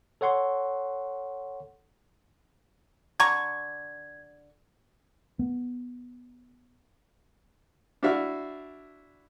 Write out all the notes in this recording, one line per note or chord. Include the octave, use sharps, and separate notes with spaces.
A4 C#5 F#5 C6 C#6
D3 A#5 C#6 G#6
B3
D4 E4 F#4 E5 F5